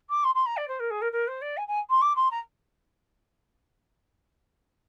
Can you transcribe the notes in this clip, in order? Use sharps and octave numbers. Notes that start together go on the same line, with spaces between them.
D6
C6
C6
A#5
D5
C5
A#4
G#4
A#4
A#4
C5
D5
G#5
G#5
C6
D6
C6
A#5